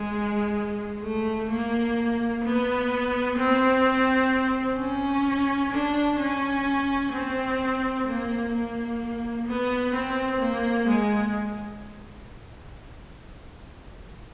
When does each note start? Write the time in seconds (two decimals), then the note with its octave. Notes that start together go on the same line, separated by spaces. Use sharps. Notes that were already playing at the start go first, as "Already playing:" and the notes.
Already playing: G#3
1.03 A3
1.50 A#3
2.44 B3
3.38 C4
4.78 C#4
5.72 D4
6.20 C#4
7.13 C4
8.07 A#3
8.54 A#3
9.47 B3
9.94 C4
10.41 A#3
10.88 G#3